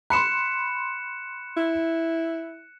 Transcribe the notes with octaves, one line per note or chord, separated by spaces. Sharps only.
B5 C6 F#6 C#7 E7
E4